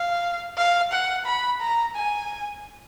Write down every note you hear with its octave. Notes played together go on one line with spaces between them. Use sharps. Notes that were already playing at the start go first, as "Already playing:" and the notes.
Already playing: F5
F5
F#5
B5
A#5
G#5